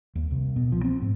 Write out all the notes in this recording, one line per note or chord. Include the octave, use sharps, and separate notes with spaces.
D#2
C2
B2
F3
C4
G#2